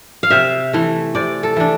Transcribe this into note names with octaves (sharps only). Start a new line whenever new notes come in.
F5
C3 E5
E3 A3
C3 D5
A4
E3 A3 D4